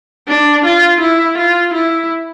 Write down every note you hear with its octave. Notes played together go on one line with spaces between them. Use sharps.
D4
F4
E4
F4
E4